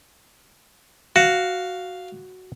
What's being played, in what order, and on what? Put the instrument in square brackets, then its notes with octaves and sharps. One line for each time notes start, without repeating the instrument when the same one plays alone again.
[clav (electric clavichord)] F#4 [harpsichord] F5